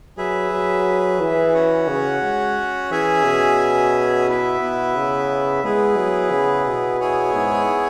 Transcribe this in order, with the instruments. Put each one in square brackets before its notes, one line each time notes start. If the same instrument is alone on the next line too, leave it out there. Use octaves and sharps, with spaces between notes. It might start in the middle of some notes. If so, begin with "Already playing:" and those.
[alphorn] F#3 [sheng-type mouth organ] G#4 B4 E5
[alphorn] F#3
E3
[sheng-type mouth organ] C#4 F#4 C#5 F#5
[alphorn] C#3
G#3
[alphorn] E3 [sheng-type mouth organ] C#4 G#4 E5 G#5
[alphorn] B2
[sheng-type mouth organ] B3 E4 B4 E5
[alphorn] B2
C#3
[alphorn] G#3 [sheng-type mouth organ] B3 E4 G#4 B4
[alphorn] F#3
C#3
B2
[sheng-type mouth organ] B3 E4 G#4 C#5 G#5
[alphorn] G#2